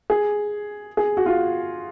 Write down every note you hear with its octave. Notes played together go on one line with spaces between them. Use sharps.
G#4
G#4
F#4
F4